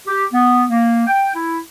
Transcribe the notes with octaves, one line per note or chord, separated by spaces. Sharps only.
G4
B3
A#3
G5
E4